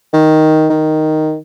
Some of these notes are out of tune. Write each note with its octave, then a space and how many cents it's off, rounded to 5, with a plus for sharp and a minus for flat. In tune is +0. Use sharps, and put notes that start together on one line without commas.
D#3 +5
D#3 +0